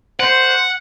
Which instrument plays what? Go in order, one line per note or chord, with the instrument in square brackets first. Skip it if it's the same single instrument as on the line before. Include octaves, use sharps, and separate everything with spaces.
[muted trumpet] C5 [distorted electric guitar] F#5